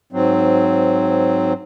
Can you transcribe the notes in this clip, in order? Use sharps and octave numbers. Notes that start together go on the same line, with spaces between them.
G#2 F#3 C4